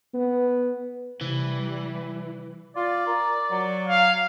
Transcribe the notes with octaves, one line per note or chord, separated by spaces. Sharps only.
B3
C3 E3 G3
F4 D5
A#4
F#3
F5